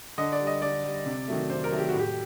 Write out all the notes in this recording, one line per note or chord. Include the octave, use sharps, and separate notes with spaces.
D3 D#5
D5
G3
D#5
D3 D5
G3
C3
D#3 F#3 A3
C3 C5
A#4
D#3 F#3 A3
G4
A2 F#4
G4